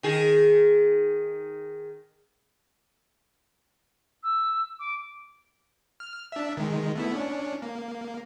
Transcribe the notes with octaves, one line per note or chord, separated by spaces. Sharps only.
D#3 G#4
E6
D6
F6
D4 E5
D#3 G#3
A3 B3 E4
C#4 D4
A#3